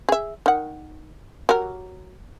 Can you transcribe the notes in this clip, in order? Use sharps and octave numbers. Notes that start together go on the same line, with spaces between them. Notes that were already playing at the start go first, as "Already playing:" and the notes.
G#4 E5
D#3 F#5
F#3 G4 A#4